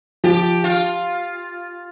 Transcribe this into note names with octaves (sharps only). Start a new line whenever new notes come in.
F3 G4
F4